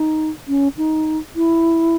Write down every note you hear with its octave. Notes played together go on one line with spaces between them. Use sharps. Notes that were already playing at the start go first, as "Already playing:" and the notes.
Already playing: D#4
C#4
D#4
E4